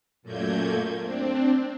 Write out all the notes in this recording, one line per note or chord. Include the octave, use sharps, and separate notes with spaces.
F#2 A#2 A3 A#3 G6 G#6
C4 D4